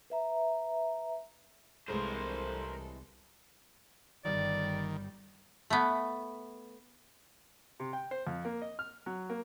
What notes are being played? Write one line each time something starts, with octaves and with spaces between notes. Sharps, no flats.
B4 E5 A#5
C2 E3 G#3 A3 A4 A#4 C5 C6
G1 D#3 G3 D5
A3 B3
C3
G5
C5
F2
A#3
D#5
F6
F#3
A#3